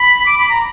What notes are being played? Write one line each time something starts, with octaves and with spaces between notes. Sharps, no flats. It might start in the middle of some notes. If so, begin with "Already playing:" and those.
Already playing: B5
D6
B5
A#5